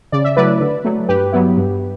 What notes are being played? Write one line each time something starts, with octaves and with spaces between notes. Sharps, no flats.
C#3 D5
E5
F#3 A3 E4 B4 D5
D3
F#3 A3
G2 G4 B4
F#3 B3 E4
G2